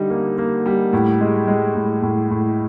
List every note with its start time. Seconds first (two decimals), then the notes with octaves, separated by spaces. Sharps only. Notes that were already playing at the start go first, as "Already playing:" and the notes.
Already playing: D3 G3 D#4
0.10 A#3
0.38 A#3
0.66 G3
0.93 A2
1.21 G#3
1.48 G#3
1.75 A2
2.02 A2
2.31 A2